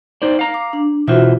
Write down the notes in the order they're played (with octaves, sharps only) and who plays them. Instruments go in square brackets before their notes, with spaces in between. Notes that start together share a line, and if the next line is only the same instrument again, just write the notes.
[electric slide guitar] D#4 C5 D5
F5 A#5
[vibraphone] D6
D4
[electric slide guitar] B2 E3 C5 [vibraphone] F4 F#4 E5